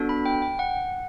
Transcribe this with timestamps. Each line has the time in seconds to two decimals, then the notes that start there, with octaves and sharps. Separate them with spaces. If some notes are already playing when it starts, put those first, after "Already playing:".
Already playing: B3 D4 F#4 A4
0.09 B5
0.26 G5
0.42 G5
0.59 F#5